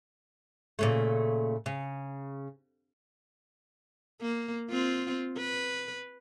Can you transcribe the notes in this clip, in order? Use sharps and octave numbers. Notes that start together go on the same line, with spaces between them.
A#2 C#3 A3
C#3
A#3
C4 F4
B4